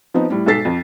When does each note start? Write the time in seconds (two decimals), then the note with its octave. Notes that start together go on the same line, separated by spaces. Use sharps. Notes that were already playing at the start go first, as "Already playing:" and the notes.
0.14 F3 B3 C4 D#4
0.30 A2 G3
0.46 B1 G#2 A4 A6 B6 C7
0.65 F2